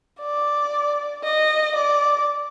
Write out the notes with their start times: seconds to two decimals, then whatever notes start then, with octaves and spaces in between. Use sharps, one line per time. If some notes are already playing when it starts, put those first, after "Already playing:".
0.20 D5
1.23 D#5
1.75 D5